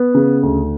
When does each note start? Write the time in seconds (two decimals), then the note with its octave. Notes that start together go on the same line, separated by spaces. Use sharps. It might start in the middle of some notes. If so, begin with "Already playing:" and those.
Already playing: B3
0.15 C#3
0.43 D2